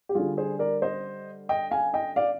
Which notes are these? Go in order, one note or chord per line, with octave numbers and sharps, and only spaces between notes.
G4
D3 G3 F4 G#4
G#4 C5
A#4 D5
C5 D#5
D#5 G5
F5 G#5
D#5 G5
D5 F5